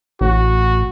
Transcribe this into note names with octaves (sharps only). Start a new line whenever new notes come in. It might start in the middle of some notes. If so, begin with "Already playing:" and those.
A1 F#4